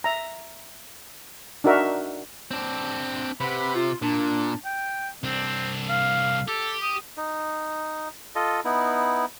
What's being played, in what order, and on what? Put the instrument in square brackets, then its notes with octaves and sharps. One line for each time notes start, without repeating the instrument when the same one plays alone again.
[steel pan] E5 A#5
D4 D#4 F#4 A#4 E5 F#5
[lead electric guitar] C4 D4
[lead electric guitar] C3 [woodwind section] B4 F#5 B5
[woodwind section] F4
[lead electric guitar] A#2 [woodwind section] D4
[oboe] G5
[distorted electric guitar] C2 D4 [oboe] C4
[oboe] F5
[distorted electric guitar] G4 [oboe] A4
[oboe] D#6
[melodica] D#4
F4 A4 D#5
B3 D#4 E4